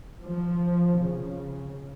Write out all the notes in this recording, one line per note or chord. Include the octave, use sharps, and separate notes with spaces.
F3
C#3